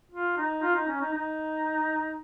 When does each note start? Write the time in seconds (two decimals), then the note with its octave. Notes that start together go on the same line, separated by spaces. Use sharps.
0.11 F4
0.37 D#4
0.62 F4
0.75 D#4
0.88 C#4
1.01 D#4
1.13 D#4